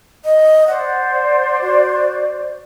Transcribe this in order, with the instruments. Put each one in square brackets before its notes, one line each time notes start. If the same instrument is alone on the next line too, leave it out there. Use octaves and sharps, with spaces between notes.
[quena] D#5
[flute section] C5 D5 [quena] F#5
[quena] F#4